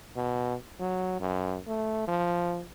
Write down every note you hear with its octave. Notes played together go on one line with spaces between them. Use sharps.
B2
F#3
F#2
A3
F3